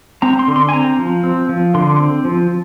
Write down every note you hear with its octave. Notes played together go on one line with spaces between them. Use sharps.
C4 A#5
C6
D3
C6
G#5
C4 A#5
F3
C4
F3
D3 C6
C4
F3